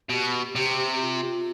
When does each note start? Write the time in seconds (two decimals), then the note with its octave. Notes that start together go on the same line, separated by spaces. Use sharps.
0.09 B2 G4
0.56 C3
1.01 F4